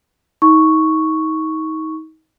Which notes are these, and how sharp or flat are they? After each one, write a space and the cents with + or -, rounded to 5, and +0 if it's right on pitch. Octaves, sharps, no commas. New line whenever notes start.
D#4 +30 C#6 +0